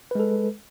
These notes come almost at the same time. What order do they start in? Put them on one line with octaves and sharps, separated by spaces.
B4 G#3 A4